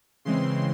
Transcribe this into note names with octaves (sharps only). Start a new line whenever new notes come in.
C#3 E3 G#3 C4 C6